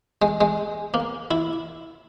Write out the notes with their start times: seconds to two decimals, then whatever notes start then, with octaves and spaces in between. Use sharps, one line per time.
0.22 G#3
0.41 G#3
0.94 A#3
1.31 E4